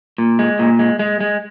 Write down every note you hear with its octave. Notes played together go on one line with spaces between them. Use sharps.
A#2
G#3
A#2
G#3
G#3
G#3